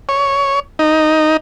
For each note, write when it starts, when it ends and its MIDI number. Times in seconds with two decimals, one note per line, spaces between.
0.09 0.60 73
0.79 1.37 63